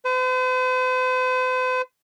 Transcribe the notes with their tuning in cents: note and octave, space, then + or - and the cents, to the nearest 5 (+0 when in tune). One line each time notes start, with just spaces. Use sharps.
C5 -45